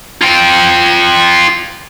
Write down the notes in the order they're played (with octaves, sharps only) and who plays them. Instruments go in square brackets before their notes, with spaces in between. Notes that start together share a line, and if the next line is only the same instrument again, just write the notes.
[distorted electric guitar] F4 G5